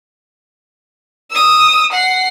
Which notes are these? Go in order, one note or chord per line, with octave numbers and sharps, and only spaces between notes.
D#6 E6
F#5 C7